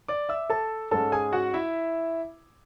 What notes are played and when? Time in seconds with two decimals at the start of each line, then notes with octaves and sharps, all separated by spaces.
0.08 D5 D6
0.29 E5 E6
0.50 A4 A5
0.91 G#2 G#3 C#4 A4 A5
1.12 G#4 G#5
1.32 F#4 F#5
1.54 E4 E5